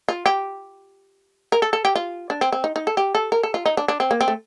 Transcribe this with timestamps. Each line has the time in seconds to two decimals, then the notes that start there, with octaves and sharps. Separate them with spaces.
0.08 F4
0.26 G4
1.52 A#4
1.62 A4
1.73 A4
1.85 G4
1.95 F4
2.30 D4
2.41 C4
2.52 C4
2.64 D#4
2.76 D#4
2.87 A4
2.97 G4
3.15 A4
3.32 A#4
3.43 A4
3.54 F4
3.66 D#4
3.77 D4
3.88 D4
4.00 C4
4.11 A#3
4.21 C4
4.28 A3